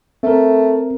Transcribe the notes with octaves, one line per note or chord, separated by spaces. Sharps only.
A3 C4 A#4